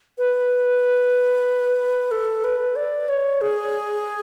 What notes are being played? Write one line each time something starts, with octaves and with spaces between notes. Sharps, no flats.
B4
A4
B4
D5
C#5
G#4